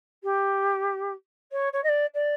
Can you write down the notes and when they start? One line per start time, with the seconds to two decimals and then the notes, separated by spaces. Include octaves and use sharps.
0.23 G4
1.51 C#5
1.72 C#5
1.83 D#5
1.88 D5
2.14 D5